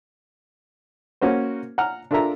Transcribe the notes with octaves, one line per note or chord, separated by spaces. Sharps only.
A#3 C#4 F#4 C5
F#5 A#5 F6
D4 F4 A4 A#4 E5 A#5